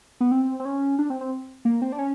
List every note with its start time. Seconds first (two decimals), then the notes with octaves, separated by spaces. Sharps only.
0.20 B3
0.32 C4
0.60 C4
0.65 C#4
0.99 D4
1.10 C4
1.21 C4
1.65 A#3
1.82 C4
1.92 D4
1.99 C#4